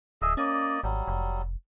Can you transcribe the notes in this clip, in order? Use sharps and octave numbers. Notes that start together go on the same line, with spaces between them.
D1 G#4 D#5 E5
A#3 C#4 D5 D#5
G#1 F#3 G3
F1